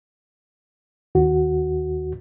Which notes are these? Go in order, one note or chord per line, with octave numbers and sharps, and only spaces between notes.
D#2 F#4